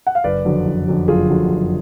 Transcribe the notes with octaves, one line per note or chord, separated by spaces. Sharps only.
F#5
F5
F#1 B4 D5
F2 D3 F#3
F#1
F2 D3 F#3
F#1 F4 G#4
F2 D3 F#3
F#1